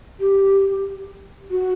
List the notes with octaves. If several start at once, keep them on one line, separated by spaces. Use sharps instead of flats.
G4
F#4